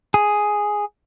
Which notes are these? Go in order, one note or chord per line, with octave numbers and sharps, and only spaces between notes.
G#4